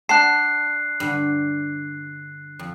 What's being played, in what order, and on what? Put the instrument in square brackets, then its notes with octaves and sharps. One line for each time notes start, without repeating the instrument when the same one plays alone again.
[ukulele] D4 F#5 A5 [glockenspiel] F#6 C7
[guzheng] G2 D3
F2